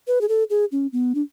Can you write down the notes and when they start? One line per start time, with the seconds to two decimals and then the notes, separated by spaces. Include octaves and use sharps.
0.07 B4
0.21 G#4
0.28 A4
0.50 G#4
0.72 C#4
0.93 B3
1.15 D4